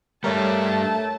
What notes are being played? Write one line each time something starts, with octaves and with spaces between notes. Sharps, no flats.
G2 G3 A3 A#4 C#5 A5